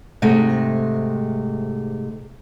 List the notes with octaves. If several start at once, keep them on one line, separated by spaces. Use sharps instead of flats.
G#2 C3 G#3 A3